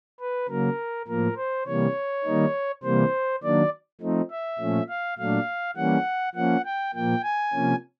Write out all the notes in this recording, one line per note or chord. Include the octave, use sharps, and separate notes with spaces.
B4
C#3 F#3 A#3 A#4
A2 F3 A#3 A#4
C5
C3 E3 G3 A#3 C#5
D#3 G3 A#3 D#4
C3 E3 G3 A#3 C5
D#3 F#3 A#3 D4 D5
F3 A3 C4 D#4
E5
A#2 F3 A3 C#4
F5
A#2 F#3 A3 D4 F5
E3 G3 A#3 C#4 F#5
F3 A#3 C#4 F#5
G5
A#2 F3 A#3 G5
G#5
C3 F3 A#3 C#4